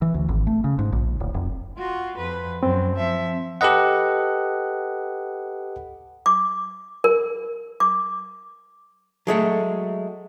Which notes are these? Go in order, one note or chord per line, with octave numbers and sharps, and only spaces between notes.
E3
D2
G#1
A3
C#3
G#2
A#1
D1
F1
F4 F#4
F2 B4
F#2 C4
F3 E5
G4 A4 B4 D#5 F#5
D6
A#4
D6
F#3 G#3 A3 F#4